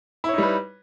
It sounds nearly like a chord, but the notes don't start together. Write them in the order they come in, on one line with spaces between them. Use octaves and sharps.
E4 C#5 D#4 G3 B4